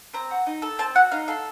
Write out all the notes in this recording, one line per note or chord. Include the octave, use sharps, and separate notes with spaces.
C4 A#5
F#4
D#4
A4
C4 A5
F#4 F#5
D#4 F5
A4 F5